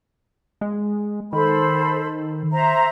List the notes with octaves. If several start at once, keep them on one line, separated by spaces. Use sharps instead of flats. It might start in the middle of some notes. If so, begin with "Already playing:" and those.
G#3
D#3 A4 C5 B5
C5 E5 A#5